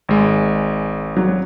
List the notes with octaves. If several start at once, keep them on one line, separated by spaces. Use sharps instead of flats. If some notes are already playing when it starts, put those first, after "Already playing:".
G#1 G#3
F#3